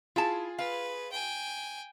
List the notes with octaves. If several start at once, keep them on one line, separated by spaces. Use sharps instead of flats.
E4 F4 G#4 A5
B4 F5
G5 G#5